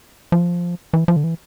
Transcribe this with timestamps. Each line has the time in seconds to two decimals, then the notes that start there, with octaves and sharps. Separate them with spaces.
0.32 F3
0.93 E3
1.08 F3
1.16 D3
1.24 E3